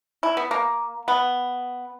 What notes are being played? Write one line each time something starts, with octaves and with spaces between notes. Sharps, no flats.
E4
B3
A#3
B3